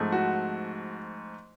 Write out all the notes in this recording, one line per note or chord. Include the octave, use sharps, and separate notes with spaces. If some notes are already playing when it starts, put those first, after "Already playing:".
Already playing: G#2 F3 A3 C4
F#4